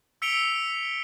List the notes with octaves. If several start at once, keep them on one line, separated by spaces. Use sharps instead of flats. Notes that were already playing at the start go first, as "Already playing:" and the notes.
E6 B6 C#7 D7 F7 G7